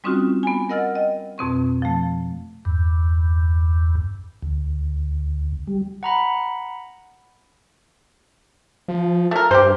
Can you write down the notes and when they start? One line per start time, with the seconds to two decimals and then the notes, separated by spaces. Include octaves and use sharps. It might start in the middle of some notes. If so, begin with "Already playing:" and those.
0.04 G3 C4 C#4 D#4 F4 F#4
0.43 B3 G#5
0.69 A#4 D#5 F#5 E6 F6 A6
0.95 D#5 G5
1.38 F2 B2 C4 C#6
1.82 F3 A3
2.65 E2 G2
4.43 D2
5.67 G3
6.03 F#5 A#5 B5
8.88 F3
9.31 A3 A#4
9.51 G2 G4 C5